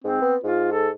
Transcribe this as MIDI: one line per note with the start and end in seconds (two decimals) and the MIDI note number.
0.04 0.20 44
0.04 0.34 60
0.22 0.37 59
0.44 0.91 44
0.44 0.71 65
0.72 0.89 69